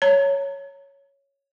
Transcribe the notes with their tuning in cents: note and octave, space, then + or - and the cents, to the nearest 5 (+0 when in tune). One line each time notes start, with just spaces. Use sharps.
C#5 +0 A#5 -30